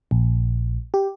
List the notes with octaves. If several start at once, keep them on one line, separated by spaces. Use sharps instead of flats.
A#1
G4